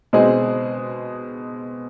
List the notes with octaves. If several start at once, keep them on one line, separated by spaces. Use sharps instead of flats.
B2 G#3 C4 D#4 G#4